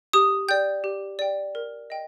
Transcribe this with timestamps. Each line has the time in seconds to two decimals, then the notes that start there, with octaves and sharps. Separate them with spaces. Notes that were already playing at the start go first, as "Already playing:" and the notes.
0.13 G4 D#6
0.48 D5 G5 G6
0.84 G4
1.19 D5 G5
1.55 A#4
1.90 D#5 G5